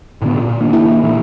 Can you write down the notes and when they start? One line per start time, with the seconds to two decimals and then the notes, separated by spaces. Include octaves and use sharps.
0.22 A2 D3 B3
0.37 A#2
0.61 D#3 A#3 D4
0.73 E4
1.03 A#2 E3